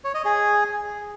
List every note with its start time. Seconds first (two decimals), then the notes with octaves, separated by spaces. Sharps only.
0.04 C#5
0.14 D#5
0.25 G#4